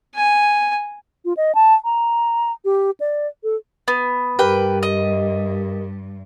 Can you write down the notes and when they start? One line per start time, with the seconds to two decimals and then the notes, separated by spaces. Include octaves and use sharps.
0.15 G#5
1.25 F4
1.37 D#5
1.55 A5
1.84 A#5
2.65 G4
3.00 D5
3.44 A4
3.88 B3
4.39 G2 G4 A#4 B4 G5
4.83 D#5